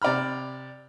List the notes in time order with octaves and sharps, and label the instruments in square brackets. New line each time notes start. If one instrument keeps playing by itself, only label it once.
[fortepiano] C3 D5 A#5 B5 F6